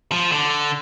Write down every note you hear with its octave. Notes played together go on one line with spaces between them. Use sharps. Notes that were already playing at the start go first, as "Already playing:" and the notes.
F3
D3